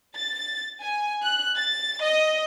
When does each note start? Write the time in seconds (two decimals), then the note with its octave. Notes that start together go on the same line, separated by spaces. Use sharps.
0.15 A6
0.81 G#5
1.23 F#6
1.55 A6
2.02 D#5